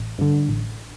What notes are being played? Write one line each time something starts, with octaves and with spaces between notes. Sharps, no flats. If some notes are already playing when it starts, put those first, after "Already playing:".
Already playing: A1
G2 D3
A1